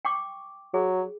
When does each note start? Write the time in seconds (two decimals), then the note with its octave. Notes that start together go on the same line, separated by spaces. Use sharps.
0.05 G5 C#6 D6
0.74 F#3 G#4